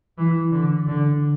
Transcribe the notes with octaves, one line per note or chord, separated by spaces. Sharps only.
E3
D3
D3